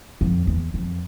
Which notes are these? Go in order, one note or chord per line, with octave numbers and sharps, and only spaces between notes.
F2
E2
F2